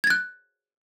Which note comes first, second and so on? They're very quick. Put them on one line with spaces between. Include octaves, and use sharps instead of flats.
G#6 A6 F#6